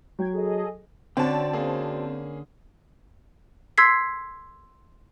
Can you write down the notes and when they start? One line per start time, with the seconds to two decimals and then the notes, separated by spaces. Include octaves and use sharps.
0.19 F#3 G5 G#6
0.33 G#4 A4 D#5
1.17 D3 C4 C#4 F#4 D5 G5 A5
1.53 A#3 C#4 G#4
3.78 C6 E6 G#6 B6 C7